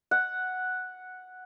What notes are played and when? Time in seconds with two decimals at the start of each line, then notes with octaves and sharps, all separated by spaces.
0.11 F#5